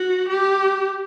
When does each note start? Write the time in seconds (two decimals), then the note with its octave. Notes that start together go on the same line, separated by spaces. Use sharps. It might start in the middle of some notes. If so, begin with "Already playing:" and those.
Already playing: F#4
0.29 G4